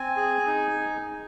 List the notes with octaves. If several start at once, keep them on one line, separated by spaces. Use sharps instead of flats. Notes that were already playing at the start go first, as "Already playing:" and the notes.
Already playing: C4 G#5
G#4
D#4